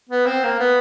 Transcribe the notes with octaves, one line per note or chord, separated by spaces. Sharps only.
B3
C4
A#3
B3